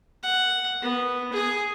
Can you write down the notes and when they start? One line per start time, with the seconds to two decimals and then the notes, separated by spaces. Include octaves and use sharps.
0.23 F#5
0.82 B3
1.33 G#4